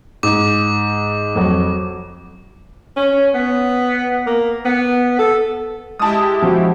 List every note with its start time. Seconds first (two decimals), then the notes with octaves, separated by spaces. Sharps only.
0.23 G#2 D6
1.36 F2 F#3
2.97 C#4
3.34 B3
4.27 A#3
4.65 B3
5.19 A4
5.99 G#3 E4 G4 A5 D#6
6.42 F3 F#4